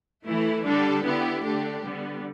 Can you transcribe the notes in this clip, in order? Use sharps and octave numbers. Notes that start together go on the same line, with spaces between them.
E3 A3 E4
D3 G3 D4 A4
D3 B3 E4 G4
D3 A3 D4 G4
D3 G3 B3